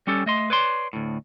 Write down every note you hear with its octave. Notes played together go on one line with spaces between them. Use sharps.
G3 C#4 G4 A4
A3 D#5 C6
B4 C#5 D5 C6
D2 A2